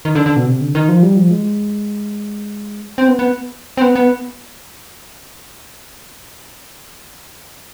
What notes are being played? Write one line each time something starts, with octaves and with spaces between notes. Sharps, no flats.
D#3
D3
D3
B2
C3
D3
D#3
F3
G3
F3
G#3
C4
B3
B3
C4
B3
B3